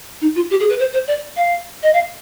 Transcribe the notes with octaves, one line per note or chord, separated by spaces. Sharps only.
D#4
F4
G4
G#4
B4
C5
C5
D5
F5
D#5
F5